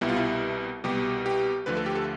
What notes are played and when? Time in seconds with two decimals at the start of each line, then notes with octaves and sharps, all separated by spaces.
0.01 C2 B2 G3 E4
0.09 F4
0.16 E4
0.84 C2 B2 G3 G4
1.26 G4
1.66 D2 D3 F3 A3 B4
1.77 A4
1.86 G4
1.95 A4